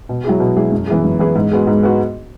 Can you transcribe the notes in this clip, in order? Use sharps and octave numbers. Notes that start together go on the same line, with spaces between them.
B2
F#3 E4 G#4
B2
F#3 E4 G#4
F#2
E3 B3 E4 G#4
F#2
E3 B3 E4 G#4
G#2
G#3 B3 F#4
G#2
G#3 B3 F#4